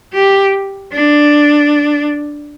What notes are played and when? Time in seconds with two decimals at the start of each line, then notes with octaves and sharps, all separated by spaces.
0.13 G4
0.93 D4